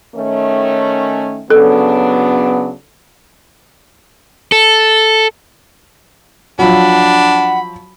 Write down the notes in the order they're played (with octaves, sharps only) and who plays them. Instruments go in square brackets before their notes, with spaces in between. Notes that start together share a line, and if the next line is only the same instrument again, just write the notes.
[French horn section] D#3 A3 C#4
[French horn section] C#3 F#3 D4 [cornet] B3 [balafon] A4
[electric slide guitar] A4
[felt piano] F3 F#3 [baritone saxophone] D4 [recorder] F#5 [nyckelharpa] B5